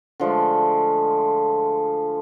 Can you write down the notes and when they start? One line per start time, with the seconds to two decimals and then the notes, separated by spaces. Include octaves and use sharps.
0.20 D3 F3 G#3 A3